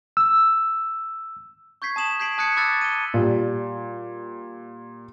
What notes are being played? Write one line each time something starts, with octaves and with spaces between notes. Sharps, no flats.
E6
C#6 G6 G#6 B6 C7
A5 D#6 E7 F#7
G6 G#6 B6 C7 D7 F#7
A5 D#6 F#6 G#6 B6 C#7
B5 D6 E6 F#6 A6
D#7 G7
A#2 G3